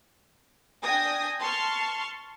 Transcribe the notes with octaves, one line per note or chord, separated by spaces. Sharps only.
D4 G5 G#5 D#6 A#6
A5 C6 C#6 F6